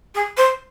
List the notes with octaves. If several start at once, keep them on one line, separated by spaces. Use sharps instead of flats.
G#4
C5